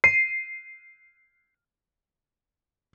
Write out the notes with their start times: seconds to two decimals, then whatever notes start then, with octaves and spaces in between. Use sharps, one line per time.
0.04 C7 D#7